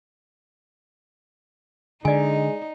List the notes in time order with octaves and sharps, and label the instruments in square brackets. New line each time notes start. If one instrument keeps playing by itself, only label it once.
[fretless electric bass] D3 [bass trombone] G#3 [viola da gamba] D#4 [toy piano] D5 G#5